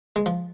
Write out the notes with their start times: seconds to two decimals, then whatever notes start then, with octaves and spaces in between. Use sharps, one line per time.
0.16 G#3
0.26 F3